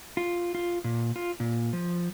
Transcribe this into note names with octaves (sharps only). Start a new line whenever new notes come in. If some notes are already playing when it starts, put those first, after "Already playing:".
F4
F4
A#2
F4
A#2
F3